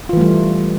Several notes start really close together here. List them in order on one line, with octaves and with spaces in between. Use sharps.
F4 E3 A3 G3